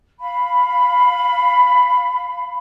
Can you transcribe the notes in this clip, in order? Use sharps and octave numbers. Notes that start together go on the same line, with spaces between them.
F5 B5